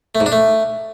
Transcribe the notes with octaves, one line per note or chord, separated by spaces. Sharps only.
A3
G#2
D4
A3